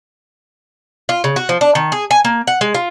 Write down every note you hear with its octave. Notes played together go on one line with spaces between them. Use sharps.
F4
C#3
F#4
F3
D4
D#3
G#4
G#5
A#3
F#5
G#3
F4